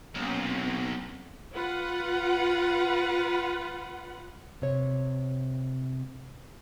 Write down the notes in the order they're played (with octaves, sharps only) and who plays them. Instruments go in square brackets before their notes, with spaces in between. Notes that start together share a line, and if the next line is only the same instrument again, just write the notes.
[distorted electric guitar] B1 [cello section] A#3 C4 C#4
[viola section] F4 B4 F#5
[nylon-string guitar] C3 C#5